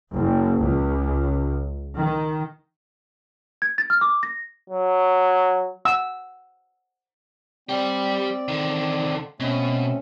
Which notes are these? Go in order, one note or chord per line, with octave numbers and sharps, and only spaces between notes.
F#1
C#2
D#3
G#6
A6
F6
D6
A#6
F#3
F#5 E6
G3 C4 G4 D5
D3 D#3
B2 A3 C4 C#4